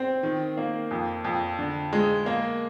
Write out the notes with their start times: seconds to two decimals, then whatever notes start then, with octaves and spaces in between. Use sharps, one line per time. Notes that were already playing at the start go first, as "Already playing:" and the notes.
Already playing: C4
0.23 D#3
0.57 A#3
0.91 F2
1.25 F2
1.59 D3
1.93 G#3
2.26 A#3